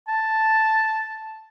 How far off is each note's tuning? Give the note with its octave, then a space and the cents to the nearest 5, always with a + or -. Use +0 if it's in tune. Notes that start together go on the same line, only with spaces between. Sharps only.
A5 +0